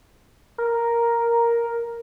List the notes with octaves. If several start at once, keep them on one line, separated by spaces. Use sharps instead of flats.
A#4